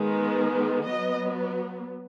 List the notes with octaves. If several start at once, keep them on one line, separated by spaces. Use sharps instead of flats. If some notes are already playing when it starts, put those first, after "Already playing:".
Already playing: D#3 G#3 B3
F#3 B3 D#5